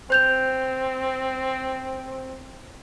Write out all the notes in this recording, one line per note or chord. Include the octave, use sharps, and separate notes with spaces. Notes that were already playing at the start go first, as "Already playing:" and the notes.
C4 C5 G6 F7